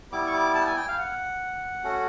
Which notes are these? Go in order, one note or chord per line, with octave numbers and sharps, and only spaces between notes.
G3 B3 E4 D6
C#6
D6
A5
G5
G#5
G5
F5
F#5
A3 C#4 F#4